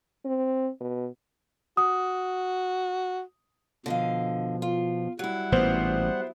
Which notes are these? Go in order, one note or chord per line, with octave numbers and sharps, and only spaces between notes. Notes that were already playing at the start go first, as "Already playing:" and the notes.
C4
B2
F#4 D#6
B2 D3 F3 D#5 F5
F4
F#3 G3 E4 F#5
A1 A#2 B3 C5